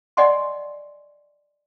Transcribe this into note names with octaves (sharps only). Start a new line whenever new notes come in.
D5 D#5 F#5 G#5 C6 C#6